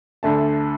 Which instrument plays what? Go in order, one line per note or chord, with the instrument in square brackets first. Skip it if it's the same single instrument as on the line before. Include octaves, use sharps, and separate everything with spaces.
[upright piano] D2 D3 A3 A5